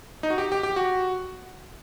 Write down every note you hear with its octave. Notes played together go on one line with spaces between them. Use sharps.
D#4
F#4
G4
G4
G4
F#4